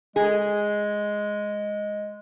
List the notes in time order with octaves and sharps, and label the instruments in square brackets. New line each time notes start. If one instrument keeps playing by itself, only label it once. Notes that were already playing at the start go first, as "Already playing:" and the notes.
[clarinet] G#3 [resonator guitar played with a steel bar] G#4